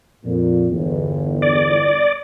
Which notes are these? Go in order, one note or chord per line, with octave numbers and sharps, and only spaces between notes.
F2 A#2
G1 E2
D5